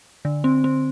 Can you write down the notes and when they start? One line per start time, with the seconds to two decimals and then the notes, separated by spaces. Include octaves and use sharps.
0.25 D3
0.44 C4
0.64 C4